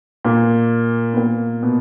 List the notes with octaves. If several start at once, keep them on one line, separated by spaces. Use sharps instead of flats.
A#2 A#3
B3
A#2 A#3
B2 B3